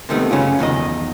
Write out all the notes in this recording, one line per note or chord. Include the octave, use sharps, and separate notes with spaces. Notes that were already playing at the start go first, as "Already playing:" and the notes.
C3 D#3 A3 B3
F#2 C#3 C#4 F4
B1 E2 D#3 D#5